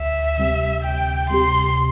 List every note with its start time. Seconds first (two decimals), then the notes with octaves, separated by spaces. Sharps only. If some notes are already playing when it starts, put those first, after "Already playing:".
Already playing: D2 E5
0.38 C3 G3 C4 G4
0.83 D2 G5
1.30 C3 G3 C4 G4 C6